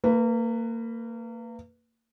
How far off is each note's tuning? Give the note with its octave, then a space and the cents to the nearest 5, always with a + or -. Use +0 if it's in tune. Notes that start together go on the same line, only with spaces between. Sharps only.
A#3 -30 B4 +0